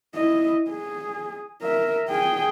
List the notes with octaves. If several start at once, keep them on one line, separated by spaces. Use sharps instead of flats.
E4 D#5
G#4
A#4 E5
G#4 G5